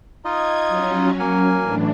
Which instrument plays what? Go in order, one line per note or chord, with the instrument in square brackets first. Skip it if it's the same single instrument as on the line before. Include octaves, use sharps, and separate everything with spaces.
[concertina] D#4 F4 D#5 [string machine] G#6
[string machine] F#3 C#4
[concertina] A#3 A#4 G#5
[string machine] A2 E3 D4